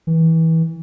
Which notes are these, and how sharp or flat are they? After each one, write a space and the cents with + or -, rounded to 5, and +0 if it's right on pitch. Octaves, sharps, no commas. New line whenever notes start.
E3 -25